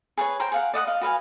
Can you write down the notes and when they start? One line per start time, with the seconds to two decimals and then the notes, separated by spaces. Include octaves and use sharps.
0.17 G#4 B4 C#5 G#5
0.40 C5 G5 A#5 C6
0.52 G#4 F5 F#5
0.74 D5 D#5 F#5 D#6
0.87 D#5 F5
1.01 F#4 B4 F5 G#5